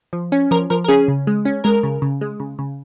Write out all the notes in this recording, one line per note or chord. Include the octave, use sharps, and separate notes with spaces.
F3
C#4
F3 A#4
F3 A#4
A#4
C#4 G#4
C#3
G#3
C#4
G#3 A#4
C#3
C#3
G#3
C#3
C#3